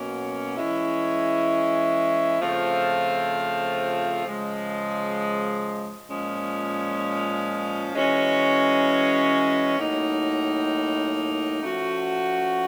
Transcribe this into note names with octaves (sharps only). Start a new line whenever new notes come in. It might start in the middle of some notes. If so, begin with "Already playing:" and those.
Already playing: B2 F#3 A#3 C#4
E3 G#3 C#4 E4
C#3 F3 A3 C4 F4
C#3 F3 G#3
A#2 F3 G#3 C#4
E3 G#3 C#4 F#4
A2 F#3 A#3 D#4
F3 A3 C#4 F#4